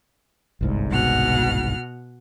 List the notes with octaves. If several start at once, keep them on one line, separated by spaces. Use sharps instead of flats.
G1 C2 G#2
B2 F#5 F6